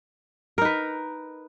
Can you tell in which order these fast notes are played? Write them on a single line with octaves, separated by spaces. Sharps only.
A#4 D#4 B4